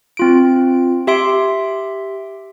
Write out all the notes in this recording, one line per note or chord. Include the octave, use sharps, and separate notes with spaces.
C4 F4 D7
G4 E5 C6 D7